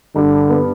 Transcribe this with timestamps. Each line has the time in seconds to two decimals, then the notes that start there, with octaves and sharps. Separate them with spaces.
0.16 G2 D3
0.49 B3